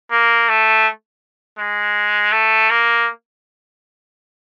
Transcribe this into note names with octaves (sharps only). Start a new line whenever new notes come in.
A#3
A3
G#3
A3
A#3